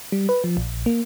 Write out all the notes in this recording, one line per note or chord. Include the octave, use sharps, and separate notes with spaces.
G3
B4
F3
A#1
A#3